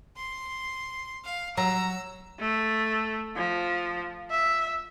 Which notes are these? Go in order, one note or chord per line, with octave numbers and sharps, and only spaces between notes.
C6
F5
F#3 A#5 E6
A3
F3
E5